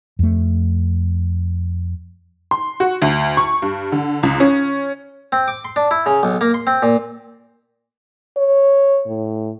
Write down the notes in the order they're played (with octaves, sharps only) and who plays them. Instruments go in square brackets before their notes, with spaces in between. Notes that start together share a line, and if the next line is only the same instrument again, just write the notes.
[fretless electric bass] F2 A3
[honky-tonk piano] C6
F#4
D2
C#6
G2
D3
C#2
C#4
[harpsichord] C4
D6
C6
D4
E4
C#3
B1
A#3
C6
C4
A#2
[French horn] C#5
A2